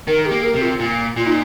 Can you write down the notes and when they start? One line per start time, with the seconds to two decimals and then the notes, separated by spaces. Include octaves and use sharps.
0.07 D#3 A#4
0.26 G4
0.32 A#3
0.43 A#4
0.55 C3
0.62 F4
0.80 A#2
1.16 A#2 F4
1.27 D#4